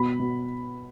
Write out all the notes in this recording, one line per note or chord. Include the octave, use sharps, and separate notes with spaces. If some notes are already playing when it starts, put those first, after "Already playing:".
Already playing: B2 B5
B2